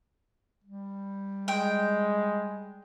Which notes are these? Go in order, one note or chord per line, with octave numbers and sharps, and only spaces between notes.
G3
G#3 G5